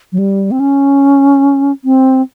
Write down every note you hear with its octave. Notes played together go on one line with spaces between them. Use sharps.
F#3
G3
C4
C#4
C4